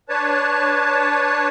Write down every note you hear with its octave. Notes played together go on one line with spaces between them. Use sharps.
D4 B4 C#5 A5